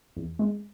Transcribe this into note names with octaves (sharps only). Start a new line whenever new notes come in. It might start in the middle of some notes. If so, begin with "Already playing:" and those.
E2
G#3